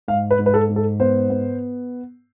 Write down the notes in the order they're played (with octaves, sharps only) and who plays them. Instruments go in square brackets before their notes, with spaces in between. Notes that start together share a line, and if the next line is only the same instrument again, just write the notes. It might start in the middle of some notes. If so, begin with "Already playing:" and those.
[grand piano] G#2 F5
B4
G#2
B4
A4
G#2
A4
B3 C5
B3